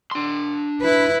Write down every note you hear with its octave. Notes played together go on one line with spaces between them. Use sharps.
D4 C6
E4 B4